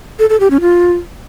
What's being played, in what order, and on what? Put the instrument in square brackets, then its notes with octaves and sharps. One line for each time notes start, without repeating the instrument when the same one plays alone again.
[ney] A4
A4
G4
C#4
F4